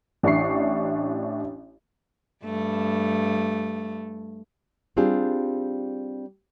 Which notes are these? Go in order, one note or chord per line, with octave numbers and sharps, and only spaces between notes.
A1 D4 E4 C#6 C7
G2 A3
G3 C4 D4 F4 G4 G#4